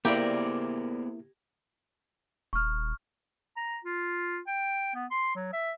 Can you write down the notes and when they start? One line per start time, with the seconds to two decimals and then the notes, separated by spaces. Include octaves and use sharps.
0.05 A#3 B3 E4 G4 G#4 A#4 C5 D5
2.53 D#1 C#6 F6
3.56 A#5
3.84 F4
4.47 G5
4.95 B3
5.11 C6
5.35 F#3
5.53 E5